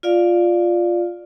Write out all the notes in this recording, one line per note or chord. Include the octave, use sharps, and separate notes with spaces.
F4 D5 F5